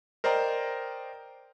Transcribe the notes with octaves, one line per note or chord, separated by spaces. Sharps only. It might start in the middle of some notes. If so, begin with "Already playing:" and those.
A#4 C5 D5 D#5 G5 A#5